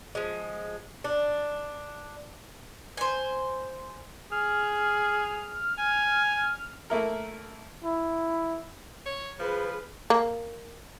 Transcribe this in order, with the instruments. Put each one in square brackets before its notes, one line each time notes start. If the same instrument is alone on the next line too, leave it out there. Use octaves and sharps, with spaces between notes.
[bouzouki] F3 G#3
D4
[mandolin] C5 G#5
[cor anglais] G#4 [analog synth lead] F6
[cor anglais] G#5
[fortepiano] A3 A#3 E4 A#4
[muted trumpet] E4
[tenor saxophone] C#5
[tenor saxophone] F3 [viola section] G#4 B4
[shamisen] A#3